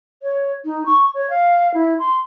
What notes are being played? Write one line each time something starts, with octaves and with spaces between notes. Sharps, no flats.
C#5
D#4
C#6
C#5
F5
E4
C6